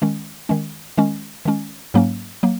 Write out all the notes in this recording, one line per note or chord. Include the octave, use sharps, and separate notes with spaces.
D#3 G#3 C#4
D#3 G#3 C#4
D#3 G#3 C#4
D#3 G#3 C#4
G#2 F#3 A#3 C#4
F#3 A#3